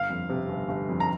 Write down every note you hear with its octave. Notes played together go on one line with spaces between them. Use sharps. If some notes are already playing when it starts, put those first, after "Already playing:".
Already playing: G1 F5
F2
C3
G1
G1
F2
A#5